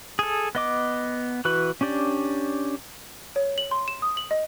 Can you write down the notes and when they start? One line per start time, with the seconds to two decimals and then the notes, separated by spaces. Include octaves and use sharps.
0.19 G#4 A4
0.55 B3 D#5 D6
1.45 E3 F#4 B4
1.81 C#4 D4 G4 D5
3.36 C#5
3.58 F#7
3.71 C6
3.88 E7
4.02 D#6
4.17 F#7
4.31 D#5